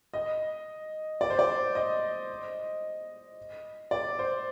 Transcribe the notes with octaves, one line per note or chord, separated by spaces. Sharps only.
D#5
D5
C5
D5
D#5
D5
C5